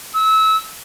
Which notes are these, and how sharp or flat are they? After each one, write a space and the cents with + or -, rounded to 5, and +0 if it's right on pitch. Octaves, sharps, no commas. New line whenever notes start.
E6 -25